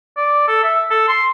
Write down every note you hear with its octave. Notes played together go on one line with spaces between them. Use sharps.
D5
A4
E5
A4
C6